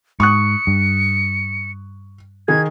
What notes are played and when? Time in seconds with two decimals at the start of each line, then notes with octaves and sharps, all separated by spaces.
0.20 G#2 C#6 D#6 F#6 C#7
0.67 G2
2.48 D#3 G#4 G#6